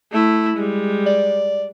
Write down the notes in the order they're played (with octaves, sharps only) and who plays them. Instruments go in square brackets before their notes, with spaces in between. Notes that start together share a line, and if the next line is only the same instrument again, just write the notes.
[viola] A3 E4
G3 G#3
[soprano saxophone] D5